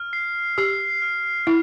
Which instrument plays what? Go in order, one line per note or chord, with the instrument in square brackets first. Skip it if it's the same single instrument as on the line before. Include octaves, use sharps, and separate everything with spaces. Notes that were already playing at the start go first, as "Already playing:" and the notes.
Already playing: [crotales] F6
C7
[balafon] G4 [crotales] C7
[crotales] F6
[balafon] E4